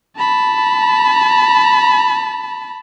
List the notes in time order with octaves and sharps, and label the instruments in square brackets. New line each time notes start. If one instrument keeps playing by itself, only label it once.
[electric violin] A5 B5